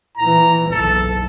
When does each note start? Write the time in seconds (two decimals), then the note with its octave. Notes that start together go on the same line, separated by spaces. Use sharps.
0.18 A#2 E3 A#5
0.71 F#1 B1 A4